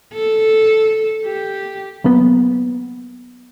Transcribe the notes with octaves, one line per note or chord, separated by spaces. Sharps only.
A4
G4
F#3 A#3 B3